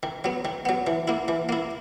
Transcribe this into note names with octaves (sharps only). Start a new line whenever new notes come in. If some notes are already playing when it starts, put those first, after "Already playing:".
D#3
F#3 B3
D#3
F#3 B3
E3
A#3 E4
E3
A#3 E4